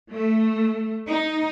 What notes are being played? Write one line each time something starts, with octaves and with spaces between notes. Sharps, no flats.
A3
D#4